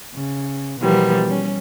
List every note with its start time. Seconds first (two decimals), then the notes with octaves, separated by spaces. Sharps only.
0.15 C#3
0.80 B2 E3 F3 G3 A#3 B3
1.25 G3 C#4